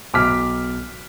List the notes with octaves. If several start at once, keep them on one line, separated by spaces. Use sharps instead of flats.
B1 D6 F6 B6